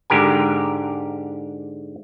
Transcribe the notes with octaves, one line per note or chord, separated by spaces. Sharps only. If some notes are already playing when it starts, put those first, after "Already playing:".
G#2 D3 G4 A#4 G#5